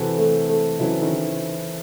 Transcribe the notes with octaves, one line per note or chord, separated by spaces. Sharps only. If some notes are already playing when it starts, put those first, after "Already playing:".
Already playing: C3 E3 C4 F#4 A4
A3
A3
C#3 E3 F#3 C4 E4 A4
D#3